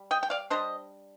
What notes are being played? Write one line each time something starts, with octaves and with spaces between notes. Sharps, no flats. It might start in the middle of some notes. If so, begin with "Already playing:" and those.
Already playing: G3
D#5 G5
G5
D5 F5
G3 D4 C5 D#5